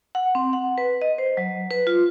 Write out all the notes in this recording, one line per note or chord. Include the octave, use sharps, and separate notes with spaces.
F#5
C4
F#5
B4
D#5
C5
F#3
B4
F4